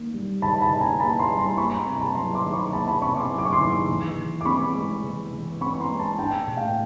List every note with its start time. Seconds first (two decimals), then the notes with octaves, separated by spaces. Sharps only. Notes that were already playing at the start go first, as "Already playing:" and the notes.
Already playing: D#3 A#3
0.14 G3
0.42 D#3 A5 B5
0.62 A5 B5
0.71 D#3
0.81 G#5 A#5
1.00 A#3 A5 B5
1.19 A#5 C6
1.29 G3
1.38 A#5 C6
1.58 A#3 B5 C#6
1.72 A#5 C6
1.86 C3
1.96 A#5
2.01 A5 B5
2.15 F#3 A#5 C6
2.35 C6 D6
2.44 D#3
2.53 B5 C#6
2.73 A#3 A5 B5
2.88 A5 B5
3.02 C3 B5 C#6
3.16 C6 D6
3.30 F#3
3.38 D6
3.45 C#6
3.53 C6 D6
3.59 D#3
3.89 E3
4.17 E3
4.41 D6
4.45 C4 B5 C#6
4.74 G#3
5.04 E3
5.33 E3
5.61 C4 B5 C#6
5.80 A#5 C6
5.90 G#3
5.99 A5 B5
6.18 D4 G5 A5
6.47 A2
6.57 F5 G5